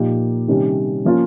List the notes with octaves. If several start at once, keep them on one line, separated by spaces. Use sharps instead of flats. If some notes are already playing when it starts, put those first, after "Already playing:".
Already playing: A#2 F3 A#3 D#4 G4
C3 D#3 G3 C#4 G4
F3 A#3 C#4 F4